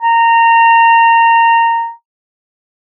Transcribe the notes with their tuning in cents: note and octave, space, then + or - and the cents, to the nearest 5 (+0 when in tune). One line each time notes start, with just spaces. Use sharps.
A#5 -20